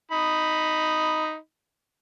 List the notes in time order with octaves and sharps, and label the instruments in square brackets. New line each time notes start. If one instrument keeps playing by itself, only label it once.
[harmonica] D#4 B5